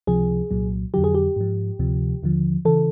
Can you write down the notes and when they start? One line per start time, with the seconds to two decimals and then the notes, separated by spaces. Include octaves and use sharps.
0.07 C#2 C3 F3 G#4
0.51 C2 A#2 F#3
0.94 F2 D3 F#3 G4
1.04 G#4
1.14 G4
1.36 G#2 F3
1.79 D2 C3 F3
2.23 D#2 D3 F3
2.65 C#3 E3 A4